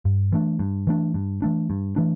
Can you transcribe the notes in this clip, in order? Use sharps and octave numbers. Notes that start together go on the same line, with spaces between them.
G2
E3 A3 D4
G2
E3 A3 D4
G2
E3 A3 D4
G2
E3 A3 D4